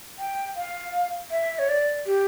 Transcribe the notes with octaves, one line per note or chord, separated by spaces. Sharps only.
G5
F5
E5
C#5
D5
G4